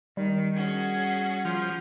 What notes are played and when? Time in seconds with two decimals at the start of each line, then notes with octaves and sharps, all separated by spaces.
0.17 D#3 G3
0.56 C#4 F#4 G#4 F#5
1.45 F3